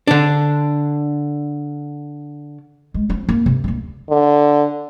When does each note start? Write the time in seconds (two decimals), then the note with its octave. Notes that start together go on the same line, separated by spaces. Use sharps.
0.07 D3 D4
2.94 G#3
3.10 F3 C4
3.29 A#3
3.46 C3
3.64 D2 A#3
4.10 D3